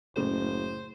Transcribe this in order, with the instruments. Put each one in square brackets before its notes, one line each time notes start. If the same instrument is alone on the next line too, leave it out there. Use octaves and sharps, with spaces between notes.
[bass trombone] F#1 [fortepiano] A2 C#3 [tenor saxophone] C5